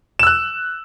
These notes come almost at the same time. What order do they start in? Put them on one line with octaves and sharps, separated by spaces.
E7 E6 F#6